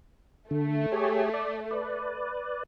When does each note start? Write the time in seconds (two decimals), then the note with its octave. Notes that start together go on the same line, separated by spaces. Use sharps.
0.51 D3 A3
0.92 G4 G#4 C#5
1.34 D5
1.71 B4 D5